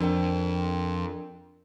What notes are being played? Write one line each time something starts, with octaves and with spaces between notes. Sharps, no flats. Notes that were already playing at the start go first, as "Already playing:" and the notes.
F2 D4 A#4 G5